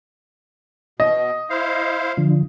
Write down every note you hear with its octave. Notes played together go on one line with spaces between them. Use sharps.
B2 D#5
E4 C5 F5
D3 F3